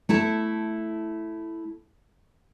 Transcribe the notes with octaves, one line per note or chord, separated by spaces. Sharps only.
A3 E4 A5